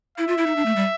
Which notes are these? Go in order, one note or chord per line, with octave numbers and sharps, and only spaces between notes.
E4 E5
F4
E4
D#4
D4
A3
G3